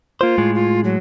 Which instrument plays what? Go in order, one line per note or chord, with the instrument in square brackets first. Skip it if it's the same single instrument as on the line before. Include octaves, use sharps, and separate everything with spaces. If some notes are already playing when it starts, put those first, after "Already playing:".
[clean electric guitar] A#3 C5 [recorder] F4
[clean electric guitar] A2 G#3
[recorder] F4
F#3